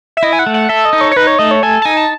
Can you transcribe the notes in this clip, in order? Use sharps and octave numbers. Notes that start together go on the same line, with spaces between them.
E5
E4 D#5
G#5
F#5
A3
F#5
A4 E5
D#5
D#4
C#5
C#5
D#4 B4
C#5
A3 D#5
C#5
A4 G#5
A5
D#4 G#5
A5